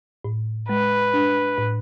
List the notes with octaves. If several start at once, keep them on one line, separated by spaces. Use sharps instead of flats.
A2
G#3 B4
D4
A2